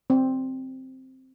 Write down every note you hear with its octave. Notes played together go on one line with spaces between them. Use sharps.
C4